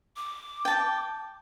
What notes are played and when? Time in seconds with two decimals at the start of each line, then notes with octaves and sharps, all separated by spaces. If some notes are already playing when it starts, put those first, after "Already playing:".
0.16 D6
0.65 G5 A5